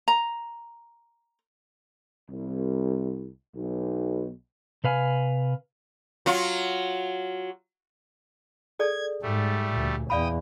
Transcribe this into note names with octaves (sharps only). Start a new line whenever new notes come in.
A#5
C2
B1
C3 B4 F5 G#5
F#3 F4
G#4 A4 D5 G#6
G#2 G3 A3
D2 A#2
E2 D5 F5 G5 B5 D#6